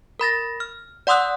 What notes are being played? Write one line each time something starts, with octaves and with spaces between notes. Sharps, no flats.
A#4 B5 A6 A#6
F6
D5 F#5 C6 D#6 E6 F#6